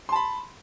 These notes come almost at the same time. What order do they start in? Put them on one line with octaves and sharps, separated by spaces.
C6 A5 B5